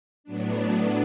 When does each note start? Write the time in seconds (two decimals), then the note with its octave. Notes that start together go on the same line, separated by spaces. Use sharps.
0.24 A2 F#3 B3 D4